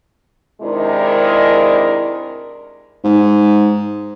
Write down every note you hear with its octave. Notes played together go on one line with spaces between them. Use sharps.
C3 D#3 G#3 D4 E4 A#4
G#2